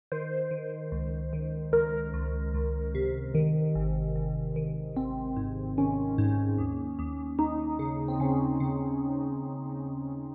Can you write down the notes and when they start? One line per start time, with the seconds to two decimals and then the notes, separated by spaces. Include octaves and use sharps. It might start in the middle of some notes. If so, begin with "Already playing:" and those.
0.12 D#3 C5
0.51 D#3
0.92 C#2
1.33 D#3
1.72 C#2 A#4
2.14 C#2
2.54 C#2
2.95 C3
3.35 D#3
3.75 G#1
4.16 G#1
4.56 D#3
4.96 G#1 C4
5.36 G#2
5.78 D#3 C#4
6.18 G#2
6.58 D#2
6.99 D#2
7.39 D#2 D#4
7.79 C#3
8.08 C4
8.20 C#3 C#4
8.60 C#3